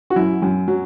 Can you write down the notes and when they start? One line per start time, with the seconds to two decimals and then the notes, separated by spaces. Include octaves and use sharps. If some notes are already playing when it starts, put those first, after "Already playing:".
0.10 F#4
0.16 F#2 E4
0.42 F#2
0.68 F#3